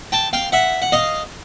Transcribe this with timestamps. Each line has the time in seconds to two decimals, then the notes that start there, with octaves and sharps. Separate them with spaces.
0.12 G5 A5
0.33 F5 G5
0.52 E5 F#5
0.82 F#5
0.92 D#5 F5